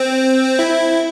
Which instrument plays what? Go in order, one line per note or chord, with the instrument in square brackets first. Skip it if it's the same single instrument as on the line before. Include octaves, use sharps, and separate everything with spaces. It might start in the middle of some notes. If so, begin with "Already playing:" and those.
Already playing: [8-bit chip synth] C4
E4